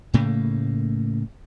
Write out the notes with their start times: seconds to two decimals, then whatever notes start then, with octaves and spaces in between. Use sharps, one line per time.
0.14 A2 C#3 A3 A#3